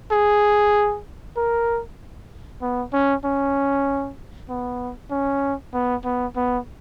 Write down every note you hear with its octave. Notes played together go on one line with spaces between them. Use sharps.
G#4
A#4
B3
C#4
C#4
B3
C#4
B3
B3
B3